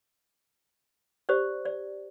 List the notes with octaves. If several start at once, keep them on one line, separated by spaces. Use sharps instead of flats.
G4 C5 D5
D5